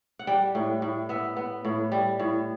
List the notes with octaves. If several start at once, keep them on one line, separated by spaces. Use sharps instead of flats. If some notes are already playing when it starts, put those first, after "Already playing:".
F#5
G3 G5
A2
A2
B3 E5
B3
A2
G3
A2